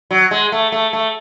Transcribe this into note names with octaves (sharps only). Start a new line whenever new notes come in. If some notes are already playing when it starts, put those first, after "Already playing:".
F#3
G#3
A3
A3
A3